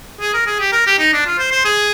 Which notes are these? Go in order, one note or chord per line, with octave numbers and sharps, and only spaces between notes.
G#4
A#4
G#4
G4
A#4
G4
D#4
D4
F4
C5
C5
G#4